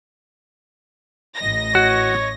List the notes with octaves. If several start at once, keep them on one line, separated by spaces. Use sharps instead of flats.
A1 D#5 A#6
F#4 C#5